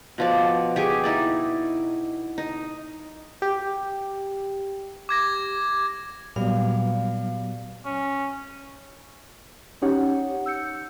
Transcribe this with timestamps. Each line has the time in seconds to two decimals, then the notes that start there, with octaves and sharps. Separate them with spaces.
0.18 B2 F3 D5
0.76 G4 G#4 C#6
1.03 D#4 E4 D5
2.38 D#4
3.42 G4
5.09 D6 G#6 A#6
6.36 A#2 F#3 G3 B3 D5 F5
7.85 C#4
9.82 C#4 D#4 G4 C#5 F#5
10.46 E6 G6 C#7